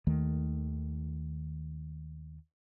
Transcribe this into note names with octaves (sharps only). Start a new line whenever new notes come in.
D#2 D#3 A3